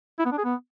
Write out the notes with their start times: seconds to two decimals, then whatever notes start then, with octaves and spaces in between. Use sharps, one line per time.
0.19 E4
0.25 B3
0.32 D4
0.38 G#4
0.44 B3